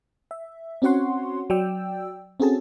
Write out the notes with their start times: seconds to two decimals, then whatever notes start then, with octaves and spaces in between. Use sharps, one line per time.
0.31 E5
0.82 C4 C#4 F#4 C#5 F#5 C6
1.50 F#3 D5 G5 E6
2.40 C4 C#4 F#4 G#4 A4 A5